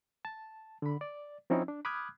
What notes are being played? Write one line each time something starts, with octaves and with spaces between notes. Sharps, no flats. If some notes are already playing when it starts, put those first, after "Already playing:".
A5
D3 B5
D5
F3 C4 C#4 D#4 E4
D4
B5 D6 D#6 F6 F#6 G#6